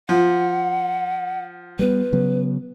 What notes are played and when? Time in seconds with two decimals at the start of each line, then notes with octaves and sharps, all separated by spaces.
0.09 F3 F#5
1.79 G3 G#3 B3 B4
2.13 C#3 F#3 B3